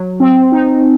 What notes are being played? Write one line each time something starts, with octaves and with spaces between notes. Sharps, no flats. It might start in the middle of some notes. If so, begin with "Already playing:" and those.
Already playing: F#3
C4
D#4